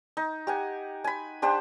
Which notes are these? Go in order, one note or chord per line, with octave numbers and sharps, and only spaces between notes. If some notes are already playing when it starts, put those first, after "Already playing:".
D#4
G4 F#5 G#5
G#5 B5
D4 G4 C5 F#5